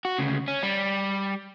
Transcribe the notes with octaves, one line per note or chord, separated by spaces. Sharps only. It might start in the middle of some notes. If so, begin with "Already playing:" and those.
F#4
D2 C#3
C#4
G3